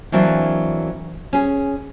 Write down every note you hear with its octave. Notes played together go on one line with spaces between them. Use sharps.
E3 F#3 A#3 C4 D4
C#4 G#4